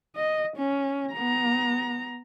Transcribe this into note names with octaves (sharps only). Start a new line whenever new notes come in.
D#5
C#4
B3 A#5